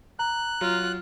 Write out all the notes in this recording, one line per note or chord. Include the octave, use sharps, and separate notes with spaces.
A#5 F#6
F#3 F4